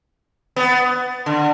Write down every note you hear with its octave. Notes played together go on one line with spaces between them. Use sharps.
B3
D3